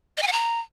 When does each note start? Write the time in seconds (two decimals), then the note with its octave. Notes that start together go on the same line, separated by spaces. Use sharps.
0.17 D#5
0.22 G#5
0.27 F#5
0.32 A#5